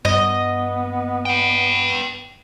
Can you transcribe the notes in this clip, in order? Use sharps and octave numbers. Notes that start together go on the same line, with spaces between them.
G2 B3 D#5
B4 G5